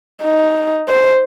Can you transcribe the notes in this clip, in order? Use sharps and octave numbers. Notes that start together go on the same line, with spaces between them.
D#4
C5